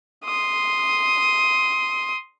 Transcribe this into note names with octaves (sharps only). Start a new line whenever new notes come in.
C6 D#6